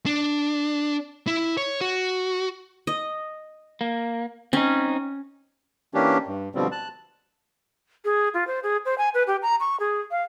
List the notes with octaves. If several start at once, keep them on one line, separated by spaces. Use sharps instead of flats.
D4
E4
C#5
F#4
D#5
A#3
C4 C#4 D#4
E3 A#3 C#4 D4 G4
G2
B2 D3 F3 G3 C4
A5 F#6
G#4
F4
C5
G#4
C5
G#5
B4
G4
A#5
C#6
G#4
F5